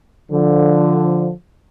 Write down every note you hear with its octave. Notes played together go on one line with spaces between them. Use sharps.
D3 F3